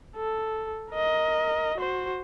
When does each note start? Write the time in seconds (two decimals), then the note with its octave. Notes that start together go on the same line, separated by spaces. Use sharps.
0.16 A4
0.93 A#4 D#5
1.78 F#4 C5